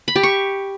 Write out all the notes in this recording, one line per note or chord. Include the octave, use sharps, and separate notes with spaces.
B5
G4
C#6